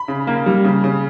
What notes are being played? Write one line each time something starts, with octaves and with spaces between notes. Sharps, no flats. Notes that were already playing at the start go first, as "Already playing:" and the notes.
Already playing: B5
C#3
A#3
G3
C#3
C#3